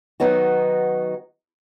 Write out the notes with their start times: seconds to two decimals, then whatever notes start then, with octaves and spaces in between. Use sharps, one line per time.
0.20 D#3 F#3 B3 D#4 F#4